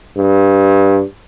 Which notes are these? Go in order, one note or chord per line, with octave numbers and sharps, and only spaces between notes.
G2